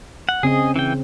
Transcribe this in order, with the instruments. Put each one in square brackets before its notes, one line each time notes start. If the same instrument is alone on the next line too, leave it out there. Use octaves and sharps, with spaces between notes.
[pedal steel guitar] F#5
[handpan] C#3 C4 [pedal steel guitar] G#4 D#5
[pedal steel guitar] E3 G5